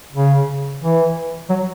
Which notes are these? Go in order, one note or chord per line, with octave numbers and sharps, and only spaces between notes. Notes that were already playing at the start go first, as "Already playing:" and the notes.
C#3
E3
F#3